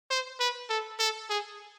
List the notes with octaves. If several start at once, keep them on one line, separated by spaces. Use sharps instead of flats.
C5
B4
A4
A4
G#4